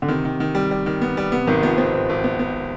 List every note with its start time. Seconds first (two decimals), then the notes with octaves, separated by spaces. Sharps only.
0.02 D3
0.08 C3 D#3
0.25 D#3
0.40 D#3
0.55 G3
0.71 G3
0.86 D#3
1.02 B3
1.17 G3
1.32 C3 B3
1.47 G#1 D#3
1.63 F3 B3
1.78 B3 C4
1.93 G#1 C4
2.09 G#1
2.24 B3
2.39 B3